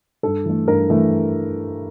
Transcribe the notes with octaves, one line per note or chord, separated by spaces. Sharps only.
G2 A4
E3 A3
G2 A#4
E3 A3